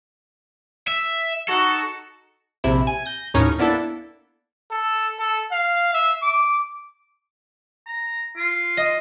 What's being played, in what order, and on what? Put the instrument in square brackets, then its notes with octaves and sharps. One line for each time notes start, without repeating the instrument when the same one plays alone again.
[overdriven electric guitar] E5
[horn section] D#4 F#4 [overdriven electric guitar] A4
[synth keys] A#1 C3 E4
G#5
G6 A#6
D#2 A2 C#4 D#4 A#4 C#5
A#3 B3 D4 E4 A4
[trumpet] A4
A4
F5
E5
D6
[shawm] A#5
F4
[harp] D#5